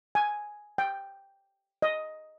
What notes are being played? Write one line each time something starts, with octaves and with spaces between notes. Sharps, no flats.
G#5
G5
D#5